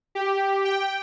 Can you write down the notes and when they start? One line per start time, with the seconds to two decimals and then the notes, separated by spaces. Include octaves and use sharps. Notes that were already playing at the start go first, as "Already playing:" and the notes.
0.15 G4
0.65 G5